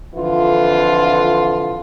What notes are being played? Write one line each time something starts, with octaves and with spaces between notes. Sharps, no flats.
F2 D3 E3 F4